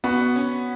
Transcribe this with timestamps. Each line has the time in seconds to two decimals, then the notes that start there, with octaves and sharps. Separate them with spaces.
0.04 B3 F#4
0.36 C#4